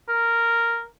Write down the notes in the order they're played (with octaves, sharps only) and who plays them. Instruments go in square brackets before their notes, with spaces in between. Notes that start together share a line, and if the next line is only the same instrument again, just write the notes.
[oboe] A#4